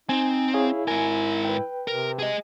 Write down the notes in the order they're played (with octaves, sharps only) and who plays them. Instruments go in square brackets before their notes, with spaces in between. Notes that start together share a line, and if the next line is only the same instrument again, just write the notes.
[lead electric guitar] C4 [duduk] D#4 [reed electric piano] G#5
[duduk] E4 [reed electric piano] G#4 C#5 F5
[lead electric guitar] G#2 A#4 [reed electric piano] G#5
[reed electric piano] B4 G5
[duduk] C3 [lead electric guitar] A#4
[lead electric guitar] G#4 D#5